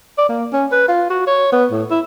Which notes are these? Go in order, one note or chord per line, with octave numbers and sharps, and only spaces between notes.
D5
A#3
C#4
B4
F4
F#4
C#5
B3
A2
E4